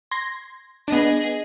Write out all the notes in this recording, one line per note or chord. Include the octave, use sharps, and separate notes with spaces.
C6 G#6 A#6
B3 D4 G#4 D#5